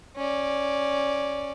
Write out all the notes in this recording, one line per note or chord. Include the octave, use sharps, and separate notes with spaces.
C#4 D5